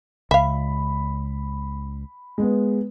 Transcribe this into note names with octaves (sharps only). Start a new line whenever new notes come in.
C#2 E5 F5 B5
G#3 B3